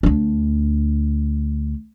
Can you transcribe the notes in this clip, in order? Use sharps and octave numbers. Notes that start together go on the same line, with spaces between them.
D2 D4